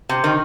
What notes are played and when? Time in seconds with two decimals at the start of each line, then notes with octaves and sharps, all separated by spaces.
0.09 C3
0.24 D#3